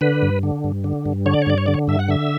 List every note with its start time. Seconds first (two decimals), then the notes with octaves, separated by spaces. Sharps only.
0.01 D3 B4
0.22 G2
0.43 D3
0.64 G2
0.84 D3
1.06 G2
1.26 D3 C#5
1.34 D5
1.42 C#5
1.47 G2 D5
1.58 C#5
1.66 D3 D5
1.74 C#5
1.88 G2 E5
1.99 F#5
2.08 D3 E5